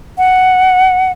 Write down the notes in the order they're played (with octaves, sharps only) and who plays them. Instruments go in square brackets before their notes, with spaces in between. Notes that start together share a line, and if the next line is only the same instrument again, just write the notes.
[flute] F#5